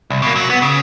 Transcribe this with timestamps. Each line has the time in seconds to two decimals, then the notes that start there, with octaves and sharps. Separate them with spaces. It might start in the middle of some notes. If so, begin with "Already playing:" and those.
0.10 C2
0.22 B2 A#3
0.36 F#2 F#3
0.50 B3
0.62 C#3